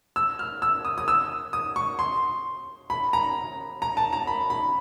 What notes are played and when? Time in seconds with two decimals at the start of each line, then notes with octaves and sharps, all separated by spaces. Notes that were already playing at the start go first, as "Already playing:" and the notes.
0.16 E6
0.39 F6
0.62 E6
0.85 D#6
0.98 D#6
1.08 E6
1.53 D#6
1.76 C#6
1.99 C6
2.90 B5
3.13 A#5
3.82 A#5
3.97 A5
4.13 A#5
4.27 B5
4.50 B5